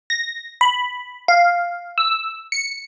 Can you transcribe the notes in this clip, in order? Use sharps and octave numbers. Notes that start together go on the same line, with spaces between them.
A#6
B5
F5
E6
C#7